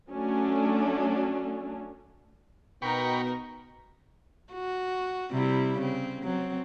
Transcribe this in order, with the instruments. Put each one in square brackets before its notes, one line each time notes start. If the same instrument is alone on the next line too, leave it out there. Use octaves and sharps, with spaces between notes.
[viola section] F#3 A3 C#4 D4
[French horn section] B2 B3 [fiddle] D#4 A#4 [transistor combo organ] G5 B5 C#6
[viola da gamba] F#4
C3 G3 E4
C#3 C4
F#3 C4